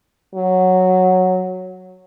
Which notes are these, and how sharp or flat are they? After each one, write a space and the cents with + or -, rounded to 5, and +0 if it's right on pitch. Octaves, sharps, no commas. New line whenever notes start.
F#3 -5